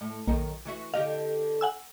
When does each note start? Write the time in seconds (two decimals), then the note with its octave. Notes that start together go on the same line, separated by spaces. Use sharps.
0.01 A2
0.28 A#1 F#2 D#3 A#4
0.65 E3 F#4 E5
0.94 D3 G4 D#5 F5
1.61 F#5 G#5 E6